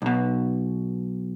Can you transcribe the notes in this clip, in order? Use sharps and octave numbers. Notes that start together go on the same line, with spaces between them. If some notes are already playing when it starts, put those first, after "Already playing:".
B1 B2